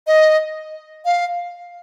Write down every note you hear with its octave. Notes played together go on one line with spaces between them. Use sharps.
D#5
F5